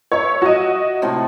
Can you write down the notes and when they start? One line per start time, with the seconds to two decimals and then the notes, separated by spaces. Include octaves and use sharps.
0.12 C#5 E5 A#5
0.42 F#4 D#5 A#5
1.02 A2 C3 F3